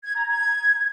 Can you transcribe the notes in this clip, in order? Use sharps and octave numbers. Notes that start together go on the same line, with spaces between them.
G#6
A#5
G#6